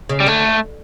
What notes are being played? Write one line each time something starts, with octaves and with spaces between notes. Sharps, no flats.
C#3
G3
D3 A3